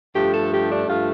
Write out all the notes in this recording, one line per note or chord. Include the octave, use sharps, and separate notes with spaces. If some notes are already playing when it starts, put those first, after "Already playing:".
G2 F3 A3 G4
A4
G4
D4
G2 F3 A3 F4